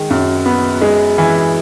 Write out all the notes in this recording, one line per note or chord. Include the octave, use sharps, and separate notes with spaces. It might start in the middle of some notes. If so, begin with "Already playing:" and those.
Already playing: D#3 G#3
F#2
B3
G#3
E3